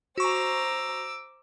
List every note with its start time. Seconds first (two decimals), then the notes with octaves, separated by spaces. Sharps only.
0.18 F#4 C5 A#5 C#6 D6 E6